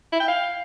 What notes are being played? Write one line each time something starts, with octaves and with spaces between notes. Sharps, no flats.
E4
G5
F5